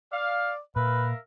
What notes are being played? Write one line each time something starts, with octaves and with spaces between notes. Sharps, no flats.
D5 F5
A#2 A#4 B4 E5 F5